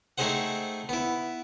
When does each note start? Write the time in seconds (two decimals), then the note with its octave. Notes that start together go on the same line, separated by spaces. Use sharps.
0.18 A3 C4 D#4 G#4 C5 F#5
0.89 B3 E4